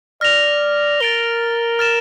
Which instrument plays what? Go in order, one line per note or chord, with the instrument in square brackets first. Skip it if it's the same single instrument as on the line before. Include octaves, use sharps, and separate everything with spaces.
[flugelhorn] D5 [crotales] F6 A#6 F7
[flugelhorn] A#4 [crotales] A6 D7 G7
[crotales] F6 A6 E7